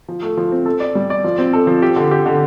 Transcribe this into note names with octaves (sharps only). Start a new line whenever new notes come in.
F3
A3
F3
C4
A4
D5
G3
D5
F3
C4
A4
F3
G4
D3
G4
D3